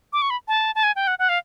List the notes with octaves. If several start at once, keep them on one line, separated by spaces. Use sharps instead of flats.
D6
C#6
B5
A5
A5
G#5
G5
F#5
F#5
F5